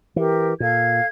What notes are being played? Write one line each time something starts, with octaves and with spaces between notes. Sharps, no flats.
E3 G4 A#4
A#2 A4 F5 G#6